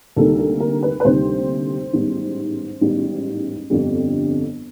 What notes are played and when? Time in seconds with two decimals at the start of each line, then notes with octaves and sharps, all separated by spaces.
0.16 D2 C3 D#3 G3 A#3 A4
0.39 A4
0.60 A#4
0.83 B4
1.00 B4
1.05 D2 C3 D#3 G3 A#3 C5
1.93 A1 G#2 D#3 G3 B3
2.81 A1 G#2 D#3 G3 B3
3.70 G1 F2 D3 G3